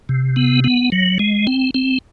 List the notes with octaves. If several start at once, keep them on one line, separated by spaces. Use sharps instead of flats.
C3
B3
B3
F#3
G#3
C4
C4